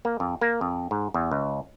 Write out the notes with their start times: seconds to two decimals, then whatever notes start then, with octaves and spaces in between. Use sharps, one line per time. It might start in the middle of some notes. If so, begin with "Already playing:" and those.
0.05 A#3
0.20 F2
0.41 A#3
0.61 F2
0.91 G#2
1.14 E2
1.31 C#2